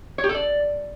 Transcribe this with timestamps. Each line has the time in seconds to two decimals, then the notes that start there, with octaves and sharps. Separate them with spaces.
0.18 C#5
0.24 G4
0.29 A4
0.35 D5